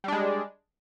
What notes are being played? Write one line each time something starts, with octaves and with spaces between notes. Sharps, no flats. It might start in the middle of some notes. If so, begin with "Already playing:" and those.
G3 G#3 D4